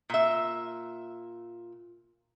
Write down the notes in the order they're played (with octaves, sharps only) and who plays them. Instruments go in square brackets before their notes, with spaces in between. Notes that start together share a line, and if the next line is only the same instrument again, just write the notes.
[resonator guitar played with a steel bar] A#2 E5